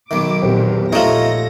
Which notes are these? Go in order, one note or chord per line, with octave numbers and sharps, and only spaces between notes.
B1 D#3 D6
A#1 E2 B3 C4 G4
A#1 A3 D#4 F4 C#5 A#6